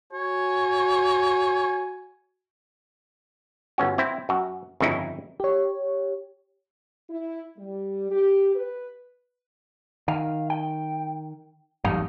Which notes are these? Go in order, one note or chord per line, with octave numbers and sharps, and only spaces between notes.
F#4 C#5 G#5
G1 C#4 F#4
C4 E4 C5
F#2 F#4
G1 F2 C#3 D#4 E4
G4 C#5
E4
G3
G4
B4
D#3 F5
G5
A1 F#2 G3 A3 D#4 F5